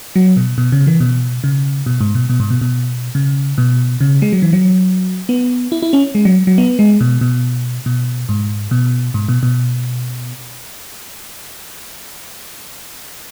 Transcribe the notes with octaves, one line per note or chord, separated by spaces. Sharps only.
F#3
B2
B2
C#3
E3
B2
C#3
B2
G#2
B2
B2
G#2
B2
B2
C#3
B2
C#3
G#3
F#3
E3
F#3
B3
E4
E4
C#4
G#3
F#3
F#3
B3
G#3
B2
B2
B2
G#2
B2
G#2
B2
B2